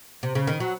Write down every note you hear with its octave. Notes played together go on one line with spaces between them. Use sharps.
C3
C#3
D#3
F#3